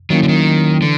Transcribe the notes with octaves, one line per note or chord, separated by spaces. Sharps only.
D#3 F#3 A#3 C#4 E4
D3
D#3
D3 E3